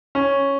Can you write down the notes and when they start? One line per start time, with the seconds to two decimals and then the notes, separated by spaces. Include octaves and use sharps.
0.15 C#4